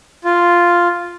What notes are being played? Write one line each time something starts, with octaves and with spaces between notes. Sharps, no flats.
F4